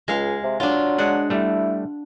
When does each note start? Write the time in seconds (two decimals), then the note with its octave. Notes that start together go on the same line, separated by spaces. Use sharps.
0.08 C#2 G#3 F5
0.44 C3
0.60 F#3 D4 F4
0.98 G#3 D4 F#5
1.30 G3 A3 E4